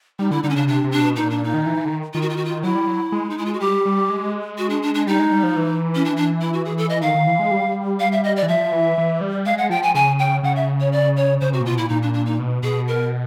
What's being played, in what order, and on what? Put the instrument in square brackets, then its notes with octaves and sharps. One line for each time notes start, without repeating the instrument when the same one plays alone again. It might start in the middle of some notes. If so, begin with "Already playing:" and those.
[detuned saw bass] G3 [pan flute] D#4
[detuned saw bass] D3 [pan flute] E4
[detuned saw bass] D3 [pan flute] D#4
[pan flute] C#4
[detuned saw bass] C#3 [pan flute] D4
[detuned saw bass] C3 [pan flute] D4
[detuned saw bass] C3
[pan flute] D4
[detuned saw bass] B2
[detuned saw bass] A#2 [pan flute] D#4
[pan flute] D4
D#4
[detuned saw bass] D#3
E3
E3
D3
D#3
[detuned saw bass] D#3 [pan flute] F4
[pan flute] F#4
F4
F#4
F4
[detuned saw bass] F#3 [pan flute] E4
[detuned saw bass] G3
F#3
G#3
[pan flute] D#4
E4
F4
F#4
[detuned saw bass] G3 [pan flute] G4
[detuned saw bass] G3
G#3
[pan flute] F#4
D4
D4
D4
[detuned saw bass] G3 [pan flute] D#4
[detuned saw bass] G#3
G3
F3
E3
[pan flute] C#4
D4
D4
E4
F#4
G#4
A4
D#5
[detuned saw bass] D#3 [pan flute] F5
[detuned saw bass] D#3
E3
G#3
G3
[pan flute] F5
E5
D#5
D5
[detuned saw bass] E3
[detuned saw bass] F3 [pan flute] E5
[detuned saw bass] E3
E3
G3
[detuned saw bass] G#3 [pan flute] F5
[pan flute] F#5
[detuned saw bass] F3 [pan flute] G5
[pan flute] G#5
[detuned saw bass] C#3 [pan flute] G#5
[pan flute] G5
[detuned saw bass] C#3 [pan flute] F#5
[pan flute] E5
C#5
D5
C#5
[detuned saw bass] C#3 [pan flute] C5
[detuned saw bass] C3 [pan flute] F#4
[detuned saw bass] A#2
[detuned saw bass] B2 [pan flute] F4
[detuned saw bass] A#2 [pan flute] E4
[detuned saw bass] A#2 [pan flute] D#4
[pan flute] D4
D4
D#4
[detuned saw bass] B2
[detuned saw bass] B2 [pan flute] G#4
[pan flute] A#4